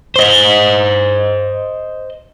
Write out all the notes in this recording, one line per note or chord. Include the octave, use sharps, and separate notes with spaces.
C5 D#5